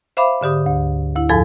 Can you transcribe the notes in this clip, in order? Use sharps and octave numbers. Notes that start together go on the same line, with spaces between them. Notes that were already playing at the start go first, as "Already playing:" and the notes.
C5 E5 F5 B5 D6
G#2 D3 G4 D#6
D2
D2 E4
F2 G#2 F3 A4 G#5